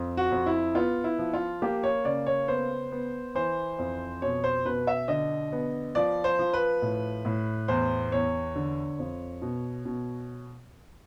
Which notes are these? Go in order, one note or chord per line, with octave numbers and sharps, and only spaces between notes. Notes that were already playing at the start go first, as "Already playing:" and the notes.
Already playing: F2
F#4
F2
E4
B3 F4
E4
F3
F4
A#3 G4
C#5
C#3 D5
C#5
B3 C5
B3
E3 C5
F2
B2 C#5
C5
B2 B4
E5
D3 D#5
B3
F3 D5
C5
F3
B4
A2
A2
E2 C5
E2 C#5
D3
F2
B2
B2